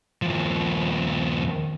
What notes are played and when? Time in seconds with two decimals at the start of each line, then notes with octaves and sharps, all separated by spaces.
0.22 D#2 F3